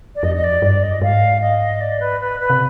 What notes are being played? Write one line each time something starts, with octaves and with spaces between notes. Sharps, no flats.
D5
F2 D#5
D#5
D5
G2 D5
D#5
G#2 F5
D#5
D5
B4
B4
B4
C3